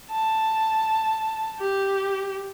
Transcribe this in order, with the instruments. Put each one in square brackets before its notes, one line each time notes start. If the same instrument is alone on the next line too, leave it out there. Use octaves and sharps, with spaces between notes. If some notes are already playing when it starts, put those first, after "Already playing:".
[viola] A5
G4